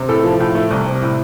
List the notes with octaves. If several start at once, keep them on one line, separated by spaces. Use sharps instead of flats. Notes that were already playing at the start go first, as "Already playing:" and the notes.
Already playing: C3
A2 A4
F3
A2
A3
C2
C3
A2